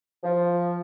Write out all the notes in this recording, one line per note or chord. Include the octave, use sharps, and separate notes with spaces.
F3